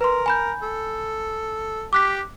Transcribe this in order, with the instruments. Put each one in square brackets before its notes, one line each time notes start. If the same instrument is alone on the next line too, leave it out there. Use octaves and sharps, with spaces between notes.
[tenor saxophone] A#4 [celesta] B4 C6
[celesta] G#5 B5 G6
[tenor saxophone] A4
[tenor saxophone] G4 [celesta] D6 F#6 B6